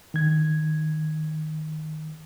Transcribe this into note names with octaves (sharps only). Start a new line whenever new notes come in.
D#3 G#6